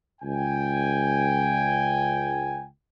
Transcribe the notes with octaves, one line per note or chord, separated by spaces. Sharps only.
C#2 G5 G#5